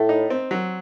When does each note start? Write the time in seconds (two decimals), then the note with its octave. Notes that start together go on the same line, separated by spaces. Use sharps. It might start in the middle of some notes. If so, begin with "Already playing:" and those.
Already playing: A2 A3
0.09 D#4
0.30 C4
0.51 F#3